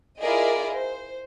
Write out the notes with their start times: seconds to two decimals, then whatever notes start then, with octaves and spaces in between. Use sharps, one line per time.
0.20 E4 F4 G#4 A#4 D5 D#5
0.77 C5